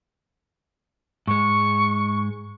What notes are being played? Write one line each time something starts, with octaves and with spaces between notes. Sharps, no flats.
G#2 G#3 C#6